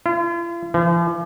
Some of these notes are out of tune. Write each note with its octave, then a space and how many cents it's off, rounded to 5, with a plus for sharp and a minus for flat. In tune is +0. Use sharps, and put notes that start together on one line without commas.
F4 -45
F3 -45